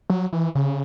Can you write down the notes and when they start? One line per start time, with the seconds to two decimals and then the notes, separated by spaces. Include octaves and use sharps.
0.10 F#3
0.33 E3
0.55 C#3